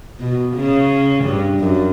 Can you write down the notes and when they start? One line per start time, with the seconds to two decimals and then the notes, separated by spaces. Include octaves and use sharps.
0.20 B2
0.56 C#3
1.24 G2
1.60 F#2